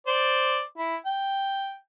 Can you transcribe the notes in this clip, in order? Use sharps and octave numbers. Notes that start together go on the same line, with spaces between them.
C5 D5
E4
G5